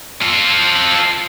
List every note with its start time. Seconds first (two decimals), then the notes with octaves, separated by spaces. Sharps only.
0.21 F4 A4